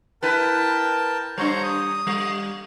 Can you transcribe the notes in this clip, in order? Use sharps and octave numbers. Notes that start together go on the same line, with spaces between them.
E4 A#4 B4 G5 A5
G3 D4 C5 C#5 A#5
D#6
G3